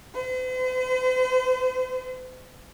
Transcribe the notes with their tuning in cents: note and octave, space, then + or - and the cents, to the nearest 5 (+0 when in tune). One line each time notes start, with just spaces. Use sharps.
C5 -45